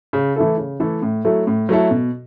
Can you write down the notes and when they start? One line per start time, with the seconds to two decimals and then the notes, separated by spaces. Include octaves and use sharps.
0.13 C#3
0.36 E3 A3 E4 A4
0.58 C#3
0.80 E3 A3 E4 A4
1.02 A2
1.25 F#3 A3 E4 A4
1.47 A2
1.69 F#3 A3 E4 A4
1.91 B2